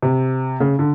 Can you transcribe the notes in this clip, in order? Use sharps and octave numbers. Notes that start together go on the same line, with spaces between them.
C3
C#3
D3